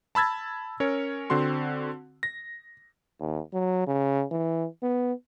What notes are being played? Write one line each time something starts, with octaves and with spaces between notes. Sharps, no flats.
A5 B5 E6 G#6 A6
C#4 A#4 C#5
D3 C4 F#4 C6
A#6
D#2
F#3
C#3
E3
B3